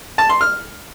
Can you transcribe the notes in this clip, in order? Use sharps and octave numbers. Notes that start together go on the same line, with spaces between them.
A5
C6
F6